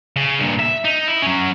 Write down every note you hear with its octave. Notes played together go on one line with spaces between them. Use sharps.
C#3
G2 A#2
E5
D#4
E4
F#3 C#4